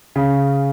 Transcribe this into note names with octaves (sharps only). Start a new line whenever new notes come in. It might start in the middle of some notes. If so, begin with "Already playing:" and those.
C#3